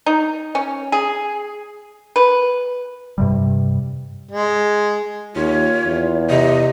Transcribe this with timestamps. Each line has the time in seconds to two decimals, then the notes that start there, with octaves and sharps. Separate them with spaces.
0.06 D#4
0.55 C#4
0.92 G#4
2.16 B4
3.18 G2 C3 G3
4.31 G#3
5.36 D#2 F4 C#5
5.86 E2
6.30 C3 D#5